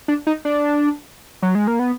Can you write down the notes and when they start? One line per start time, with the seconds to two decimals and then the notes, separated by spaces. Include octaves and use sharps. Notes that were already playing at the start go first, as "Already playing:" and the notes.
0.08 D4
0.27 D#4
0.45 D4
1.42 F#3
1.55 G#3
1.67 A#3
1.79 B3